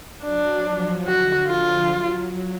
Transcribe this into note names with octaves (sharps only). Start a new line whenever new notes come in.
F#3 D4
F3
D3 F#4
F3 F4
F#3